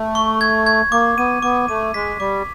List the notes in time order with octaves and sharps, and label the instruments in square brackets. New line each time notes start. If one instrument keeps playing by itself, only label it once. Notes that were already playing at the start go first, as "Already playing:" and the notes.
Already playing: [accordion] A3
[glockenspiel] C#6
G#6
G#6
[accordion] A#3 [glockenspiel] D6
[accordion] B3 [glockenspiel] D#7
[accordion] B3 [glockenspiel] D6
[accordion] A3 [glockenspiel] D#7
[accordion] G#3 [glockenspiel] B6
[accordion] G3 [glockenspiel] D6